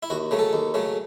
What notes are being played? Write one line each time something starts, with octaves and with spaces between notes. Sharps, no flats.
E4
D#2 F#4
C#3 F#3 A3
A4
D#2
C#3 F#3 A3